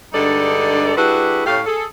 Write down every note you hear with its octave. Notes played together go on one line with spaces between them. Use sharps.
G2 D3 G#3 D#4 A4 D5
G3 D4 E4 F#4 G#4 B4
A2 A3 C#4 G4 F5
G#4 A4